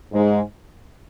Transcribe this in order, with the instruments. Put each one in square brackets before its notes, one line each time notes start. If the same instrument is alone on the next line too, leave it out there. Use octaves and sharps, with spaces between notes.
[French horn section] G#2 G#3